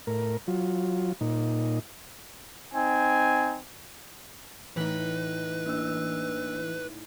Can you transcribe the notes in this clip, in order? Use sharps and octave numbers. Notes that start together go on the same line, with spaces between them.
A2 A#4
F#3 F4
A#2 D#4
C4 D#4 G#5
A2 E3 D#4 B4
A#3 D4 E6